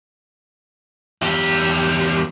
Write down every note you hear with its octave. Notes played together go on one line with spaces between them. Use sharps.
E2 G4